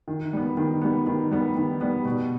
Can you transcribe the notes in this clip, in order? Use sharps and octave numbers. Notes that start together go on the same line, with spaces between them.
D#3
G3 B3
D#3
G3 B3
D#3
G3 B3
D#3
G3 B3
B2